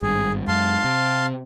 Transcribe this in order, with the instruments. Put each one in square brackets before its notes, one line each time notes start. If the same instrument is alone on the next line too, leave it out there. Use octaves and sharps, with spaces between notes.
[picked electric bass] G#1 G2 [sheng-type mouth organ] G#4
[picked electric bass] F#2 G#3 [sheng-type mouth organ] F5 A5 C6
[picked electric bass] C3